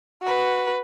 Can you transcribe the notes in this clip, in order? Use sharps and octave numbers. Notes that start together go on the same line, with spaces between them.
F#4 B4